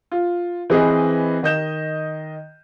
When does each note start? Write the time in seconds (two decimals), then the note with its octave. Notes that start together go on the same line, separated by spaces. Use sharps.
0.12 F4
0.70 E3 C4 G#4 B4 D#5
1.43 D#3 D#5 G6 E7